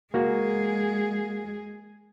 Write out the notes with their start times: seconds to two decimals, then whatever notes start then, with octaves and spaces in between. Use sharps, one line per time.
0.14 G#3 A#3 F#4 G#4